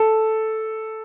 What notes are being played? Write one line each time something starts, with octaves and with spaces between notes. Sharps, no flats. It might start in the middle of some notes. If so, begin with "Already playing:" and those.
Already playing: A4